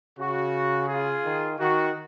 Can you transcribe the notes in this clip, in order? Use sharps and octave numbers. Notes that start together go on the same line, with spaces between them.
C#3 F#4
F4 G#4
D#3
D#3 F#4